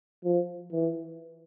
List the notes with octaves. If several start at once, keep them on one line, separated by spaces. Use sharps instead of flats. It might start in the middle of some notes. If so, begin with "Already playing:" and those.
F3
E3